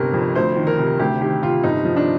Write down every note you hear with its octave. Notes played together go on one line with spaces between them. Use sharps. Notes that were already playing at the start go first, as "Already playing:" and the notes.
Already playing: G1 C3 A#4
F2
D2 C5
D#3
A#4
C3
D2 G4
D#3 G4
C3 F4
G1 D#4
F3
D4